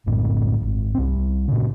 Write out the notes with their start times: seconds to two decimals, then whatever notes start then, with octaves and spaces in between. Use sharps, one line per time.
0.06 A#1 F#2 A2
0.62 D#1 G#1
0.95 C2 C4
1.48 A#2 C#3